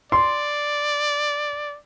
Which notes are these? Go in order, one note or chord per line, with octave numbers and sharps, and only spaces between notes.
D5 C6